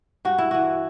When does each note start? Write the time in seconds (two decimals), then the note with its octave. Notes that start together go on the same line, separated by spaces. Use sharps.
0.25 G2 F#4
0.38 E4
0.51 E3 F#4